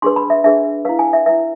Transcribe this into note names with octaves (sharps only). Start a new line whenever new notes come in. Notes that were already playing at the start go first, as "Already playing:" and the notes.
D4 G#4 B4 C6
B5
E5
D4 G#4 B4 E5
E4 B4 F5
G#5
E5
E4 B4 E5